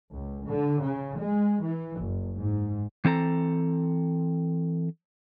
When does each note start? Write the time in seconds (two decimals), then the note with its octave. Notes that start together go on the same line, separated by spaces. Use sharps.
0.12 C#2
0.46 D3
0.82 C#3
1.19 G#3
1.62 E3
1.98 F#1
2.36 G#2
3.05 E3 C4 A4 A#5